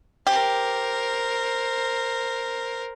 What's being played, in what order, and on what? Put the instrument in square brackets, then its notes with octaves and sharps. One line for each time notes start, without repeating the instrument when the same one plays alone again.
[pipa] G4 [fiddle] A#4 C5